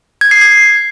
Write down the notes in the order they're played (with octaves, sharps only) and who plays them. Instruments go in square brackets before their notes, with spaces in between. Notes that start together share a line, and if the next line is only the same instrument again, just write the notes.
[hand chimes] G#6
C7
G#6